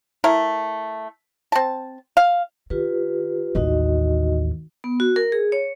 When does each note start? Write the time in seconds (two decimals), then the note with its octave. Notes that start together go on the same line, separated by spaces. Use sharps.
0.24 A3 E4 A#4
1.52 C4 A5
2.17 F5
2.70 D#3 F4 G4 B4
3.55 A1 D#2 D#4 F#4 D#5
4.84 B3
5.00 F#4
5.16 A#4
5.32 G#4
5.52 C#5